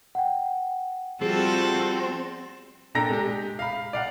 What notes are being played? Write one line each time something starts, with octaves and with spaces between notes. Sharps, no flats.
F#5 G5
F3 G3 C4 F#4 G#4 A4
A#2 D4 A4 G5 A#5 A#6
G#3 G4
F5 B5
D5 F5 F#5